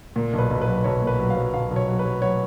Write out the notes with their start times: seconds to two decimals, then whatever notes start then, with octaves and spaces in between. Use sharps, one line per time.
0.16 A#2
0.33 B1
0.39 B4
0.51 B1
0.62 B4
0.67 F#3
0.84 B1 C#5
1.02 A#2
1.07 B4
1.19 F#3
1.30 F5
1.36 F#3
1.54 B1 F5
1.71 B1
1.76 C#5
1.88 F#3
1.99 B4
2.05 F#3
2.22 F#3 C#5